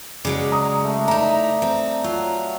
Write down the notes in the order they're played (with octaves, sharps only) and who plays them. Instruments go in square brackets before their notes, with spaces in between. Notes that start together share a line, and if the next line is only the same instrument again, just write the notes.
[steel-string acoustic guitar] C#3 F#3 G#3 [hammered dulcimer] D5
[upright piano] A#5 D#6
[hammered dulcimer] A3 D4
[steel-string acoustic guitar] D#4 E4 [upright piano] A#5
[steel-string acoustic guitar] C4
[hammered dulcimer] F#3 [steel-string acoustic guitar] F4